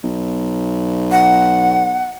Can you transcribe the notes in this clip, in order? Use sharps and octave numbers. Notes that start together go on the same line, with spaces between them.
B1
F#5